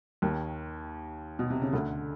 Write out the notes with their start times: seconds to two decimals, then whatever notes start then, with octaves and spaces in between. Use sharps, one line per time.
0.22 D#2 D#3
1.39 B2
1.50 C3
1.62 C#3
1.73 D2 D3